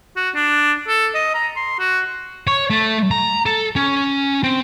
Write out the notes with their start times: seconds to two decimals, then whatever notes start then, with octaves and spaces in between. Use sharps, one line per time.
0.17 F#4
0.35 D4
0.88 A4
1.15 D#5
1.34 A#5
1.56 C6
1.79 F#4
2.47 C#5
2.70 A3
3.11 A#5
3.46 A4
3.76 C#4
4.43 C4